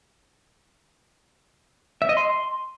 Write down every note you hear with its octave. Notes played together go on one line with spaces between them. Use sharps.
E5
D#5
C6